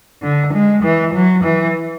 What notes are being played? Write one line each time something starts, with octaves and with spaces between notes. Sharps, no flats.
D3
G#3
E3
F#3
E3